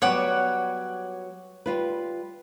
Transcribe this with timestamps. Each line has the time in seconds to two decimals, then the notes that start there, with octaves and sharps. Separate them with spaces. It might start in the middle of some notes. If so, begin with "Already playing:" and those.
0.02 F#3 G3 B3 C#5 F#5 D6
1.66 G3 F4 B4